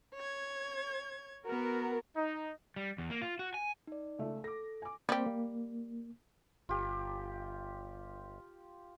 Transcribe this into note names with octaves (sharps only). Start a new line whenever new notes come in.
C#5 G#6
B3 F#4 A#4
D#4
G3
E2
A#3
F4
F#4
G#5
D#4 D5
C#2 A3 E5
A4 D6 A#6
G#5 D6
G3 A#3 C4 G4 C5
A#3
G1 F4 G4